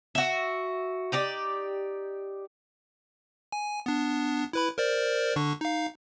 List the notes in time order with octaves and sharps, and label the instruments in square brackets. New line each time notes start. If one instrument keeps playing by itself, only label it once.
[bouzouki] F#4 E5
D#4 G4 D5
[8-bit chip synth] G#5
B3 D4
E4 B4 B5
A#4 C5 D5
D3 D4 C#6
D#4 F5